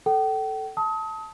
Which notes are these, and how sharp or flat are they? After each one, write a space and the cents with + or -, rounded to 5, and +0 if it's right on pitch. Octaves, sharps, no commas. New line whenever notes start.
A4 +0 G5 -40
A5 +0 D#6 +35